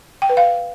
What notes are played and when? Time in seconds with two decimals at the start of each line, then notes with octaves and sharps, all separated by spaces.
0.22 G5
0.29 B4
0.37 F5